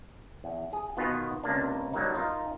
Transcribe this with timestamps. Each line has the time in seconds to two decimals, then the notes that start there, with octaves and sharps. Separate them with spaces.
0.44 E2
0.73 G#4
0.97 B2 D#3 B3 F4
1.43 C#2 C3 A#3 D4
1.93 G2 F#3 G3 A#3 D#4
2.15 D#4 F4 A#4